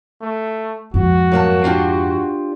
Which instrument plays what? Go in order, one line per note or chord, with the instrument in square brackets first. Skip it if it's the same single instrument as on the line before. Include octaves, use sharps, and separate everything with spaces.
[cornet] A3
[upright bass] F2 G#2 [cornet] F#4
[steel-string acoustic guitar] F#2 A#3 A5
D4 F4 G4